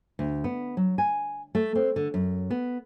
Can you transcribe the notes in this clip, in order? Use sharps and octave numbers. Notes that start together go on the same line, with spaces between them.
D2
B3
F#3
G#5
A3
C4
D3
F#2
B3